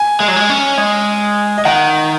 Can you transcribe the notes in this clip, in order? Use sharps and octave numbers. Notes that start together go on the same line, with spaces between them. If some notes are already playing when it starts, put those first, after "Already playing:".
Already playing: G#5
G#3
F#3
G#3
C#4
G#3
D#5
D#3 F#5